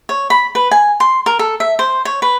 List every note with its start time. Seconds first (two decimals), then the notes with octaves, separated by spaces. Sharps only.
0.09 C#5
0.30 B5
0.55 B4
0.71 G#5
1.00 C6
1.26 A#4
1.39 A4
1.60 E5
1.79 C5
2.05 C#5
2.22 B4